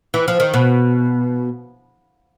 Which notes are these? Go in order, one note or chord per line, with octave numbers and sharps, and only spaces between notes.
E3
F3
D#3
B2